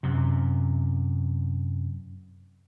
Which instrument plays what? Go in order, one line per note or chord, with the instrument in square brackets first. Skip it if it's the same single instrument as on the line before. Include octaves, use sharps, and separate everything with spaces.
[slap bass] F#2 C3